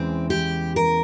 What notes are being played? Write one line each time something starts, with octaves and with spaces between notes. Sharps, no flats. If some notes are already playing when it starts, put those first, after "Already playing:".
Already playing: E2 C#3 E3 G#3 C4
G4
A#4